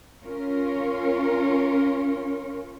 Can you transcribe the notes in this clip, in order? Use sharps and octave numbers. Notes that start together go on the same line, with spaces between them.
C#4 F4 A#4 C#5